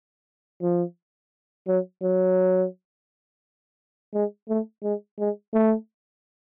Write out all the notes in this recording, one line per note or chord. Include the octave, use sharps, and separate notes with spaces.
F3
F#3
F#3
G#3
A3
G#3
G#3
A3